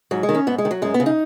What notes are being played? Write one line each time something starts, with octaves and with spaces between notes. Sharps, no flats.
G#2 F#3
G#3
D#3
C#4
G#2 B3
G#3
D#3
F#3
F#2 G#3
B3
C#3
D#4